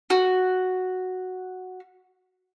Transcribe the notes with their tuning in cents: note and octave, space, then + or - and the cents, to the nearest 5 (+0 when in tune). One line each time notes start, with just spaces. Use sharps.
F#4 +0